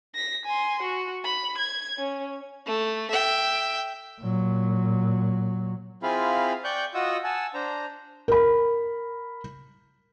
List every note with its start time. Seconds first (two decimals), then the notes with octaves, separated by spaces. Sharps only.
0.15 A#6 B6
0.46 G#5 C6
0.82 F#4
1.24 B5
1.58 G#6
1.98 C#4
2.66 A3
3.10 E5 G5
4.20 A#2 F#3
6.03 C4 E4 F4 G#4 F5 B5
6.64 D5 G5 C#6 F#6 G6
6.94 F4 F#4 D#5 F#5 D#6 E6
7.24 F#5 G#5 A5 E6
7.54 D4 C5 A#5
8.28 A#4 B5